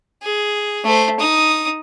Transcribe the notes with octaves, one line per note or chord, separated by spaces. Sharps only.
G#4
A3 C5
D#4 D#6